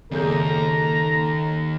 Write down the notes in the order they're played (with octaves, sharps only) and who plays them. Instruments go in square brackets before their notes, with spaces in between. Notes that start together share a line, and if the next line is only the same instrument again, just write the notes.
[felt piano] F#1 G#4 G6 [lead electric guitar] D#2 [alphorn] A4 [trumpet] A#5